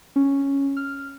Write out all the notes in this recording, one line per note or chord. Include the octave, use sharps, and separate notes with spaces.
C#4
F6